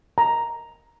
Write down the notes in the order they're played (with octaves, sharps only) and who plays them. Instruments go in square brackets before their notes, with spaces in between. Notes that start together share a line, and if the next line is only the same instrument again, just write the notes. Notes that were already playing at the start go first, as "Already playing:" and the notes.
[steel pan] A#5